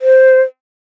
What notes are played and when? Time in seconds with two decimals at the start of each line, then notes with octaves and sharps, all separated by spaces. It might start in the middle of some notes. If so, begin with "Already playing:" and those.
0.02 C5